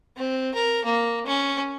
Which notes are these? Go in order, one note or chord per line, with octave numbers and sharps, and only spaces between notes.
C4
A#4
A#3
C#4